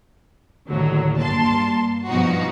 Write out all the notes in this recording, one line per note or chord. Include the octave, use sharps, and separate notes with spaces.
D#2 A2 D3 F#3
G2 A#3 A5 C6
G2 B2 F3 D#4 F#4